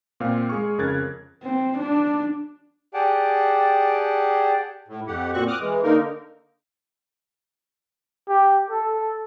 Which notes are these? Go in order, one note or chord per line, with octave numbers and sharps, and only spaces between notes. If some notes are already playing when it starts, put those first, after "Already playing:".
A#2 C4 F5 F6
G#3 G#4 C#6
F2 C#3 A#4 F#6 G#6 A6
C4
D4
G4 G#4 D5 F#5 G5 A5
A2
F2 G4 F#5
A#2 C4 F#4 C#6 F#6
D6 D#6 F6 F#6
E3 G#3
D3 A#3 D#4 A#4
G4
A4